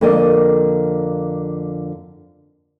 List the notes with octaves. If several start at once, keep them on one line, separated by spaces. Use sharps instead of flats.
F2 D3 A#3 A#4 D5 D#5